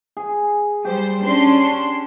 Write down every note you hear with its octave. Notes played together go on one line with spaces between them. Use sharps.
G#4
G3 G4 C5
C#4 D4 C6